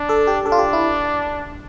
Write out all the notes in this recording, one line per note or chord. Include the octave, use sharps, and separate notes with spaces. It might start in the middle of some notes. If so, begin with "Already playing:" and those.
Already playing: D4
A4
G4
D4 A4
F4
G4
E4